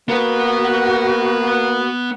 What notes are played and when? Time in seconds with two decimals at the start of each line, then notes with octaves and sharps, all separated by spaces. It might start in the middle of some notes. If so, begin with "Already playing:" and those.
0.09 A#3 B3 F#4 B4